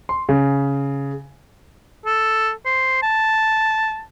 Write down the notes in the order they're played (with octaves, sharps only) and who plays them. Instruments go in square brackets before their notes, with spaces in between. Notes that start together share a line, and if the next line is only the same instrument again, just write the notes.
[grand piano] C6
C#3
[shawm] A4
C5
A5